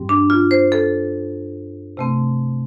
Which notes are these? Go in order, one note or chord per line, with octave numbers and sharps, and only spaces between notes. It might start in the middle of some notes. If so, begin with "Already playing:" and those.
Already playing: G2 G3 C4
D4
F4
C5
A4
C3 A3 C4